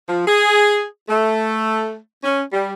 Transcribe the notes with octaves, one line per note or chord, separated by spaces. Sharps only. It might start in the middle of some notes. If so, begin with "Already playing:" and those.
F3
G#4
A3
C#4
G3